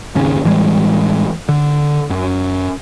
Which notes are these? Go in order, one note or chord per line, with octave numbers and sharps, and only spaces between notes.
G#1 D#2 C#3 C#4
A2 E3 G3 G#3
D3
F#2